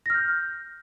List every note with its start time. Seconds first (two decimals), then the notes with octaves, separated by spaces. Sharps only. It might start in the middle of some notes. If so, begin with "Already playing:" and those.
0.06 A#6
0.10 F6
0.14 G6